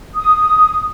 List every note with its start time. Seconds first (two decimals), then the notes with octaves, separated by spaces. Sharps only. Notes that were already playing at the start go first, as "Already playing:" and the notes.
0.15 D#6